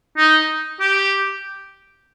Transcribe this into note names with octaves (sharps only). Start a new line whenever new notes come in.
D#4
G4